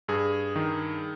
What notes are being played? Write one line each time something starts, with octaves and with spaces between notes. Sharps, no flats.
G2 G#4
D#3